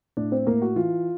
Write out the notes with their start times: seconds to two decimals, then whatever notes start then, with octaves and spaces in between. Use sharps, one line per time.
0.17 A2 D4 D5
0.32 C4 C5
0.47 A2 A#3 A#4
0.62 F#4
0.76 E3 F4